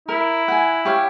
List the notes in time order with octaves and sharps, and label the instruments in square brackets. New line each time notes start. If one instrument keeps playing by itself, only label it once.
[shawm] E4 [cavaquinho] A#4
[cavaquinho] F#5 G#5
G4 C#5 F5